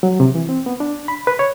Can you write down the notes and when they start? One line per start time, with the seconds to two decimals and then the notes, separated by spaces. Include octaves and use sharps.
0.03 F#3
0.20 C3
0.35 E3
0.49 C4
0.66 B3
0.80 D4
1.08 B5
1.27 B4
1.39 C#5